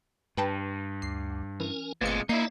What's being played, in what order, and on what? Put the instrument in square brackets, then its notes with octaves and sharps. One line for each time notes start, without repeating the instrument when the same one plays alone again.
[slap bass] G2 [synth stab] B4 G5 A5
[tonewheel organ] D2 [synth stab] C7
[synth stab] E3 [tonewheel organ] C#4 A#4 G#5
[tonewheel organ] G1 A3 F5 [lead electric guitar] A#2 G#3 [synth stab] B3 C4 C#7
[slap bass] A#3 [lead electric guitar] D#4 E4 [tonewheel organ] D5 E5 [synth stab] C7